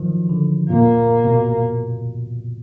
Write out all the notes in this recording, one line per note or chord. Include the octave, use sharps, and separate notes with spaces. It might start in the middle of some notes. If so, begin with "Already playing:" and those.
Already playing: D#3 F3 F#3
D3
A#2 A#3
B2